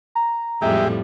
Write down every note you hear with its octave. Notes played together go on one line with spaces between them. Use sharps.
A#5
F2 A2 G3 G#3 G4 E5